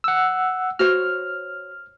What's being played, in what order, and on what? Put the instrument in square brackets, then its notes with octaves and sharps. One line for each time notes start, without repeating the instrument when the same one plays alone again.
[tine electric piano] F#5 E6
[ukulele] F#4 C5 C#5 [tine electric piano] F6